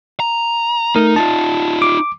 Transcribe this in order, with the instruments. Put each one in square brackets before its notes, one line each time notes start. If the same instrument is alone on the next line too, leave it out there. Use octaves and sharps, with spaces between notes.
[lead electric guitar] A#5
[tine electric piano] A3 A#4 [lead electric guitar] D#4
[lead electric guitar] D#4 F4 [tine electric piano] A5
[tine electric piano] D6